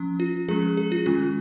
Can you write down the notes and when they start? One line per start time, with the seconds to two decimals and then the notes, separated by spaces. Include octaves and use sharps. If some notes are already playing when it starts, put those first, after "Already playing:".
Already playing: F3 C#4
0.20 F4
0.48 F3 G#3 C#4 G#4
0.77 G#4
0.92 F4
1.06 D#3 G#3 C#4 F4